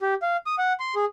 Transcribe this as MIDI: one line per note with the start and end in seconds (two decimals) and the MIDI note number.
0.02 0.14 67
0.22 0.37 77
0.46 0.55 87
0.58 0.73 78
0.80 0.95 84
0.95 1.05 68